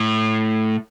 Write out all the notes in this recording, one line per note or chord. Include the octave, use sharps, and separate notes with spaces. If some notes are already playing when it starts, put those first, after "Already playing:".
Already playing: A2